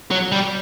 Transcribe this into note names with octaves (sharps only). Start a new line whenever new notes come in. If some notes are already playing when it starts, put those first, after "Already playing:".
F#3
G3